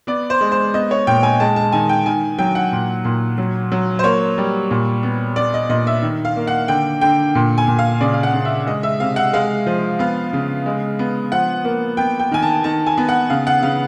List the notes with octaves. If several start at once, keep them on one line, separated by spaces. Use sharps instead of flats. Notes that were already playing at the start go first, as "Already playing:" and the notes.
B3 D5
C5
G#3
C5
B3 D#5
C#5
A#2 G5
G#5
G#3 A5
A5
D#3 G#5
G5
D#3 G#5
F#3 G5
F#5
A#2
A#2
F#3
F#3
C5
A#3 C#5
G3
A#2
B3
B3 D5
D#5
A#2 D#5
E5
D#3
F5
A#3
F#5
D3 G5
D3 G5
A#2
G#5
A#2
F5
C#3 D5
F5
F#5
C#3
E5
G#3 D#5
E5
C3 F5
F#5
G#3 F5
F3
B3 F5
C#3
G#3
B3
F3 F#5
A#3
B3 G5
G5
D#3 G#5
A5
D#3 A5
G#5
B3
F#5
C#3 F5
F#5
C#3 F5